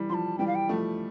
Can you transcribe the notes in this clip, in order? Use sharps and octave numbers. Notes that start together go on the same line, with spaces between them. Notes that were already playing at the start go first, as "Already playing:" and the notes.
Already playing: E3 G3
F3 C6
A5
E3 G3 G5
F5
G5
F3 A3